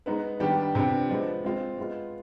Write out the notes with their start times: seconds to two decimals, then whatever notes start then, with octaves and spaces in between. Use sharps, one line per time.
0.06 G#3 B3 D#4 B4
0.40 D#3 G3 B3 D4 G4
0.75 C3 F3 B3 D4 G4
1.09 F3 G#3 B3
1.44 G#3 C4 F4
1.78 G#3 B3 F4